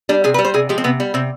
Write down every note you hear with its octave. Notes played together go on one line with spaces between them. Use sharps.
G3 D4
C3 G#4
B4
G3
C5
C3 G#4
F3 G#3 G4
C4
C3 B3
G3
C3 C4